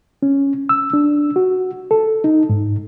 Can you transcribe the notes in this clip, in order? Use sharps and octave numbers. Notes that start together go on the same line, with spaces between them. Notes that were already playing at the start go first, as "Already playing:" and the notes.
C#4
E6
D4
F#4
A4
D#4
G#2